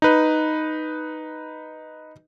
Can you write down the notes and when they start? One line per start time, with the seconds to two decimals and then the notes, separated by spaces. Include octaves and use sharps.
0.02 D#4 B4